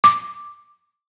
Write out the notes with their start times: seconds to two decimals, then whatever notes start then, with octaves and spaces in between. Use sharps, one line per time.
0.04 D6